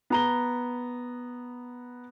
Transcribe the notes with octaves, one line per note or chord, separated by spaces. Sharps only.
B3 A#5 G7